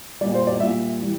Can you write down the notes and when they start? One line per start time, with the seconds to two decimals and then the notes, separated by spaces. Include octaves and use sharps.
0.21 G3 D5
0.25 A#2
0.34 C5
0.47 D5
0.60 A#2 G3 E5
1.01 E3 G3